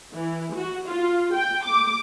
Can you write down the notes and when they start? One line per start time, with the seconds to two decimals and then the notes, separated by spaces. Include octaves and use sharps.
0.14 E3
0.56 F#4
0.87 F4
1.35 G5
1.65 D6